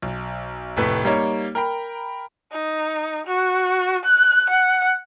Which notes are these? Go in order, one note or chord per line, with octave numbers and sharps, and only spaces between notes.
B1
F1 A2 A3 B4
G3 A#3 D#4 C#5
A#4 G5 A#5 B5
D#4
F#4
F#6
F#5